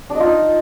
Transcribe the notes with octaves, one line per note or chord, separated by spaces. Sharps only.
D4
D#5
F4
D#4